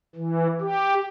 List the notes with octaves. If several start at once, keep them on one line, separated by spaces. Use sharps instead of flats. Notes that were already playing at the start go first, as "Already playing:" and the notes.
E3
G4